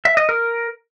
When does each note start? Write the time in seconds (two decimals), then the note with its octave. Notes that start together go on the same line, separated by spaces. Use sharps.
0.05 E5
0.17 D#5
0.29 A#4